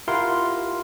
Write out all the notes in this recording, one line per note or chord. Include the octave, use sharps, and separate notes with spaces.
E4 F4 G4 A#4 F#5 C6